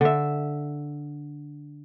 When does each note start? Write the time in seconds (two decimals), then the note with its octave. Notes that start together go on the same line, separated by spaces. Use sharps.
0.01 D3 E5